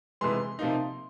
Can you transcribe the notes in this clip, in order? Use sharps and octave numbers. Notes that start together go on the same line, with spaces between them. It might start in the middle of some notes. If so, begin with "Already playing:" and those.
F2 C3 E3 G#3 C6
C3 F3 A#3 D#4